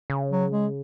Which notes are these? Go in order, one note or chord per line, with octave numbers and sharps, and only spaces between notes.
C#3
F#3
G#3